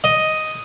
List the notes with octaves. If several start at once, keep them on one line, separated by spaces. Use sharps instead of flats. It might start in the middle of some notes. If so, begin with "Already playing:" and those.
D#5